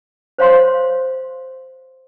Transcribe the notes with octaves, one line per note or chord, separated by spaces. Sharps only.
C5 C#5 F5 C6